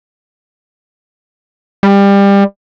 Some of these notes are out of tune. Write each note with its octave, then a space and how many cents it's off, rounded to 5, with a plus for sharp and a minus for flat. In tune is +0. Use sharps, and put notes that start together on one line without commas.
G3 +25